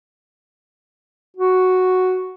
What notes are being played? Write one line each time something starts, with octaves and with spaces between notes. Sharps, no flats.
F#4